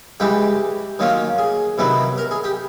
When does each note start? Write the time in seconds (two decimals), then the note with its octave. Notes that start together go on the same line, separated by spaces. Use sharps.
0.20 C#3 E3 G#3 G4
0.99 D#3 F#3 A#3 C#4 F4
1.38 G#4
1.78 C3 D#3 F#3 B3 E4
2.18 A#4
2.31 G#4
2.44 G4